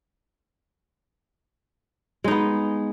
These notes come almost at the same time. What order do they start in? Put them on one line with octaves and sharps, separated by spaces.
G#3 D#4 B3